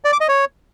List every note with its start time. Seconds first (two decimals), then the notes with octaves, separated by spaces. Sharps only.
0.05 D5
0.12 D6
0.20 D#5
0.28 C#5